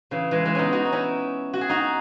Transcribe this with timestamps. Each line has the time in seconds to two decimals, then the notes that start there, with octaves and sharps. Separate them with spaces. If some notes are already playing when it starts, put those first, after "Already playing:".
0.11 C#3 E3
0.31 E3 G#3
0.45 E3 G#3
0.55 B3 C#4 D#4
0.72 D#4 F#4
0.85 D#4
0.92 C#4 E4
1.53 F#4
1.61 G#4
1.69 D#4 F#4